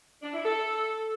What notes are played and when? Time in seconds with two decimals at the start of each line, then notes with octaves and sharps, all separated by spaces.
0.23 D4
0.34 E4
0.45 A4